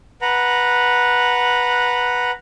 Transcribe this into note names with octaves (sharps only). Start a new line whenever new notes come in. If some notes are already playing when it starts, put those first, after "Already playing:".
B4 F#5 A#5